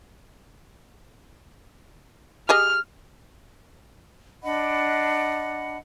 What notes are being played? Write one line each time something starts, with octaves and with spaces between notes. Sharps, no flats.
G4 G#4 D#5 F6
D4 D#5 F#5 B5